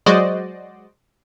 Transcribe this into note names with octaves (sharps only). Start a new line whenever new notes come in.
F#3 G#3 F#4 C5 D5 D#5